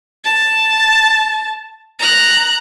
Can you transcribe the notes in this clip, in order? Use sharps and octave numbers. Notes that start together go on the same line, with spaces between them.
A5
A#5 F#6